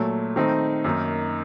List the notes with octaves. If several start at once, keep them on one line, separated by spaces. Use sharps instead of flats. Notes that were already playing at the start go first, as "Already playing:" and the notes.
Already playing: A#2 F#3 A3
D#3 A3 C4 D#4
F#2 D#3 A#3 D#4